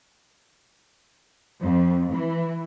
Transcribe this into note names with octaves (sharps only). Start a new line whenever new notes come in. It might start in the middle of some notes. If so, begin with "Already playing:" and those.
F2
E3